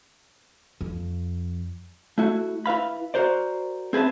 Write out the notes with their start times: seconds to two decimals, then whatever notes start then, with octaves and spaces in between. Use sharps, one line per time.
0.81 F2
2.18 A3 E4 F#4
2.66 E4 B4 F5 B5
3.14 F#4 A#4 C5 D5
3.93 C4 G#4 B4 E5 A5